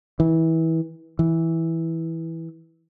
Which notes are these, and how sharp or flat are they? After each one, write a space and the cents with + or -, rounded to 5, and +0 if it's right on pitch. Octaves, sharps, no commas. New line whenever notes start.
E3 -25
E3 -10